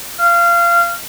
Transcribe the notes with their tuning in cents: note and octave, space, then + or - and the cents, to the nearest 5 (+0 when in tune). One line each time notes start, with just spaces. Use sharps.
F5 -20